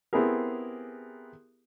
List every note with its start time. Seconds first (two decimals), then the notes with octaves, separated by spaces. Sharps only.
0.13 B3 C4 E4 G4 G#4 A#4